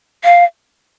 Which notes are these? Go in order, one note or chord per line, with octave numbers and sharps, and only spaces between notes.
F5